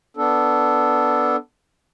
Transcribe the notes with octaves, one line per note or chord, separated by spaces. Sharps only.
B3 D4 A4